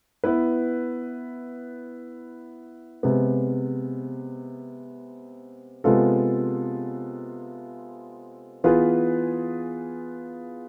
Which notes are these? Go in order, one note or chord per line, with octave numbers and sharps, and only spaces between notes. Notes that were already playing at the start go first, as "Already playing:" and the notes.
B3 E4 B4
C3 G#3 B3
C3 G#3 B3 F4 A4
E3 B3 F4 G#4 B4